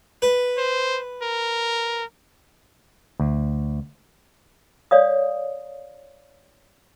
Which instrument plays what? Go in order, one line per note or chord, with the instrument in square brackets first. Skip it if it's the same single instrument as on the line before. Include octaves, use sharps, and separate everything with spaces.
[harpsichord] B4
[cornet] C5
A#4
[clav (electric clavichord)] D2
[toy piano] C#5 D5 F5 D#6